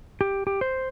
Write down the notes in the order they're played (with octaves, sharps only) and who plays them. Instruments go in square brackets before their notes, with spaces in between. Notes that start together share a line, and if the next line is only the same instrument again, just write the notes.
[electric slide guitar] G4
G4
C5